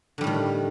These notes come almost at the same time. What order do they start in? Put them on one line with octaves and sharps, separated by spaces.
D3 G3 A2 D#3